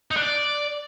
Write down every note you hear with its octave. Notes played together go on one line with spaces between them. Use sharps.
D#4
D4
D5